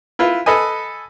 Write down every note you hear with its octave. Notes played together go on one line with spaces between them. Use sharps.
E4 F4 B4
A4 B4 D#5 G#5